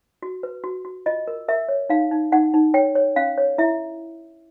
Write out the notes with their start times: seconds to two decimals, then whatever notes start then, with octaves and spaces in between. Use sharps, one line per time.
0.22 F#4
0.43 B4
0.64 F#4
0.85 F#4
1.06 F4 D#5
1.28 A#4
1.48 A#4 E5
1.69 C#5
1.90 D#4 F5
2.12 D#4
2.32 D#4 F#5
2.54 D#4
2.74 C#5 G5
2.95 C#5
3.16 C#4 F5
3.38 C#5
3.58 E4 E5